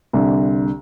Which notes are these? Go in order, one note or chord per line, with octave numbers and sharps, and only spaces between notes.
C2 D3